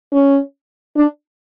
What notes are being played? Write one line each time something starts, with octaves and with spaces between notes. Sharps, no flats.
C#4
D4